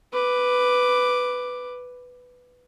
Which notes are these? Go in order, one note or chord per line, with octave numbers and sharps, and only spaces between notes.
B4 D6